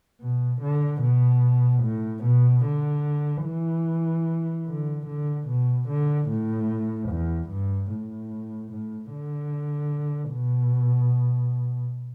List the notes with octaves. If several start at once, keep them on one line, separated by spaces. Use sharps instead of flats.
B2
D3
B2
A2
B2
D3
E3
D3
D3
B2
D3
A2
E2
G2
A2
A2
D3
B2